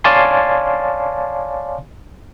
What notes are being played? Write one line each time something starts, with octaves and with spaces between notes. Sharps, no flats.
C#5 D5 F5 G#5 A5 C6